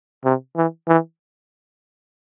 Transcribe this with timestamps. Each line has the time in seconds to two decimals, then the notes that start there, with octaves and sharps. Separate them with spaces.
0.24 C3
0.56 E3
0.88 E3